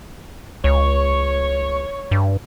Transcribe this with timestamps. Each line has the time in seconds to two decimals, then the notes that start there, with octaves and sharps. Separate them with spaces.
0.64 C#2 C#5
2.11 G2